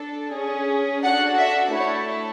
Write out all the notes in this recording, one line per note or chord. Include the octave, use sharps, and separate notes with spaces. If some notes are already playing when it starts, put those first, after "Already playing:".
Already playing: D4 A4
C#4 G#4
D4 F#4 A4 F#5
E5
A3 E4 A4 C#5